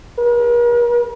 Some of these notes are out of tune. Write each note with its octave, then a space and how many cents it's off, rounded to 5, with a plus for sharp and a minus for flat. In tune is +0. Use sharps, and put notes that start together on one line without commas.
A#4 +45